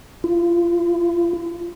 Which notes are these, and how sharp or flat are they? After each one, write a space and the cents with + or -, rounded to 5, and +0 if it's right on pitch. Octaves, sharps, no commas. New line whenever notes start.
F4 -30